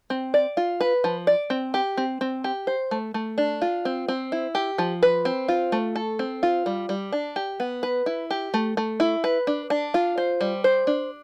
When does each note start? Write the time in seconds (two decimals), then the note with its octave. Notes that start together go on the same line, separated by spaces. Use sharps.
0.10 C4
0.34 D5
0.57 F4
0.81 B4
1.04 F3
1.27 D5
1.50 C4
1.74 G4
1.97 C4
2.21 C4
2.44 G4
2.67 C5
2.91 A3
3.14 A3
3.38 D4
3.62 F4
3.85 C4
4.08 C4
4.32 E4
4.55 G4
4.78 F3
5.03 B4
5.25 C4
5.48 F4
5.72 A3
5.96 A4
6.19 C4
6.43 F4
6.66 G3
6.89 G3
7.12 D4
7.36 G4
7.60 B3
7.83 B4
8.06 E4
8.30 G4
8.54 A3
8.77 A3
9.00 E4
9.24 B4
9.47 D4
9.70 D4
9.94 F4
10.18 C5
10.41 G3
10.64 C5
10.87 D4